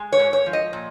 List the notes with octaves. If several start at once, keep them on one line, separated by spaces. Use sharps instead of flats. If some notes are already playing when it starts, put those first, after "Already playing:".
Already playing: G#3
C#5
G#2
C#5
F3
D#5
A#2